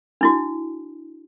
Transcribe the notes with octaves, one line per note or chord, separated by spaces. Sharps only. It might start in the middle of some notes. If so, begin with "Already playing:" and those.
D4 E4 F#4